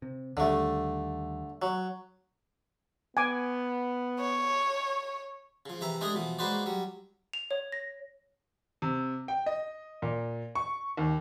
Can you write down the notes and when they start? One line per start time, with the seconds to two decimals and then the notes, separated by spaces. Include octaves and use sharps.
0.02 C3
0.37 D#2 D3 G3 A3
1.62 F#3
3.17 B3 G#5 D6
4.20 C#5
5.66 C#3 F3
5.81 C3 E3 E5 A#5
6.01 G#3 A3 D4 G4 G#4 D#5
6.15 B2 E3 F3
6.39 G#3 A#3 F#4 B4 C5 D5
6.66 F#3 G3
7.33 F7
7.51 C#5
7.72 A#6
8.82 C3
9.28 G5
9.46 D#5
10.02 A#2
10.55 C#6
10.97 D#2